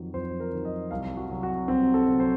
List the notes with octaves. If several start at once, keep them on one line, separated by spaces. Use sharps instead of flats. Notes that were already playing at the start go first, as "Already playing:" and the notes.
Already playing: F2 D#3 F#3
F2 C5
A#4
D#3 F#3
D#5
C2 F5
F#4
C3 F#3
F#4
C2 C4
A4
C3 F#3
C5